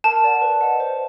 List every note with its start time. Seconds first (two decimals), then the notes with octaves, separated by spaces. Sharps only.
0.04 A#4 A5
0.24 D5 F#5
0.42 B4
0.61 D#5 F#5
0.80 C5